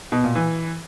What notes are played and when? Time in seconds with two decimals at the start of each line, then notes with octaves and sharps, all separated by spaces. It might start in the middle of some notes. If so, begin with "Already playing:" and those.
0.12 B2
0.24 A#2
0.35 E3